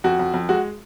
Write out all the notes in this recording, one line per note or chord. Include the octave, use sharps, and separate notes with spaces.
F2 F#4
F2
F2
G#3 F#4